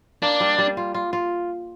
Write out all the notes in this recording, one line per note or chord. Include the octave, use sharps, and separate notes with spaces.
A#3 D4
G3
G3
F4
F4
F4